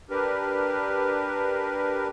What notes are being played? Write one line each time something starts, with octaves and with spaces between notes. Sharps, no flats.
D4 G4 A#4 B4